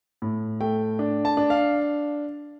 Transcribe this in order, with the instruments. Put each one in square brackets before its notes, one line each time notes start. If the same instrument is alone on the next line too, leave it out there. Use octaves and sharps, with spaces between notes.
[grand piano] A2
A3 G5
D4
A5
D4
F5